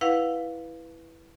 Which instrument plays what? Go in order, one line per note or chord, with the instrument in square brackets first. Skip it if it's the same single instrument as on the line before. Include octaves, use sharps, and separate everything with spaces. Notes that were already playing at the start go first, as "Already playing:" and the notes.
[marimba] E4 B4 F5 F#5